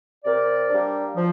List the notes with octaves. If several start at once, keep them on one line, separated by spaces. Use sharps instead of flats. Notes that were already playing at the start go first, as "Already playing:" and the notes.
C3 A#4 D5
G3 A#3 D4
F3